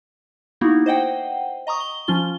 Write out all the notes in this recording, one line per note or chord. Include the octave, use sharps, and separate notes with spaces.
A#3 B3 D#4 E4 F#4
C5 D#5 F#5 G5
D#5 A#5 C#6 D#6
G7
F3 C#4 F4 G7